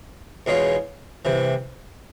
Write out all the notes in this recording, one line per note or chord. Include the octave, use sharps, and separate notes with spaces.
E2 B2 G#3 C#4 F4
C2 C3 E3